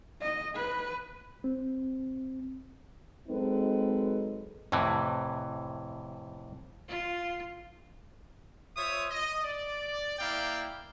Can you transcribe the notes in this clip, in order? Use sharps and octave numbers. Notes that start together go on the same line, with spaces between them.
D#5
B4
C4
F#3 G#3 C4 D#4 A4 B4
F2 A2 C3 E3
F4
F4 C5 C#5 E5 D#6
D#5
D5
A#3 E4 D5 F5 G5